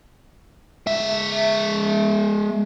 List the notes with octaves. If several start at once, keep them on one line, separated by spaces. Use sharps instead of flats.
G#3 E5